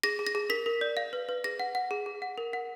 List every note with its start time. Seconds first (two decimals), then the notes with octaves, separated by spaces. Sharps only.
0.03 G#4 A#6
0.19 G#4
0.27 A#6
0.35 G#4
0.50 A#4 B6
0.66 A#4
0.81 D5
0.97 F5
1.13 B4
1.29 B4
1.44 G#4 A#6
1.60 F#5
1.75 F#5
1.91 G#4
2.06 G#4
2.22 F#5
2.38 A#4
2.53 F#5